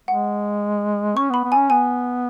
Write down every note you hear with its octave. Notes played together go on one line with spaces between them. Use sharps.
G#3 F#5
C#4 C#6
B3 B5
B3
C#4 G#5
B3 G#5